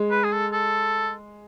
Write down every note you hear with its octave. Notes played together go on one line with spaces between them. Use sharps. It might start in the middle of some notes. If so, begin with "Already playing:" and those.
Already playing: G#3
B4
G#4
A4
A4